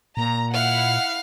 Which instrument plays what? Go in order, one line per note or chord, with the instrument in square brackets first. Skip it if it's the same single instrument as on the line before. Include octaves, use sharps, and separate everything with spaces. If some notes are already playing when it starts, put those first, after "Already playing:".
[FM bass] A#2 [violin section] A#5
[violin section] E4 F#5 [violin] F5